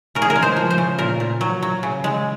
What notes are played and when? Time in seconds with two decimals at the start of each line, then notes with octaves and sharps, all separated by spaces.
0.15 C#3 A#4
0.22 G#4
0.30 A#4
0.36 G#3
0.43 C5
0.57 F3
0.70 C5
0.78 C#3
0.98 A#2 A#4
1.20 A#2
1.41 F#3
1.62 F#3
1.83 C#3
2.04 G#3